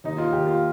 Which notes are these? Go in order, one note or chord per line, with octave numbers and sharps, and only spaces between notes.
D#2 D#4
F4
D#2 G4
F4